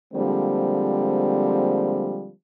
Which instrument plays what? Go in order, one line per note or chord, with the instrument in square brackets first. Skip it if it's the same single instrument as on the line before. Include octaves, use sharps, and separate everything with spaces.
[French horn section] D3 F3 G3 G#3 A#3 C4